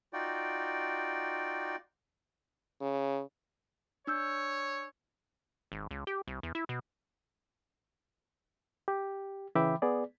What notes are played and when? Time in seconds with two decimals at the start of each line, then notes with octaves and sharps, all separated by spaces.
0.13 D#4 F4 F#4 D5 G5
2.81 C#3
4.07 D4 C#5 E6 G6
5.72 G#1
5.91 C#2
6.07 G4
6.28 C2
6.43 E2
6.55 E4
6.69 B2
8.88 G4
9.55 C#3 E3 E5 G5 B5 D6
9.82 B3 G#4 D5